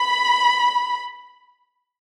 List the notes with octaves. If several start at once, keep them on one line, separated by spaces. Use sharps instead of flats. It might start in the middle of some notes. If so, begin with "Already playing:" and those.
Already playing: B5